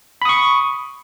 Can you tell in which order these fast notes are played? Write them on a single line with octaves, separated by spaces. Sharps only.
B5 D#6 C#6